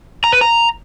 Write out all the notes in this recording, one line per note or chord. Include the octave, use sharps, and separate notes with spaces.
A#5
B4
A#5